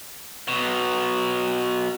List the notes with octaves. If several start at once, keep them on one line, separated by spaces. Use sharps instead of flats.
B2 F#3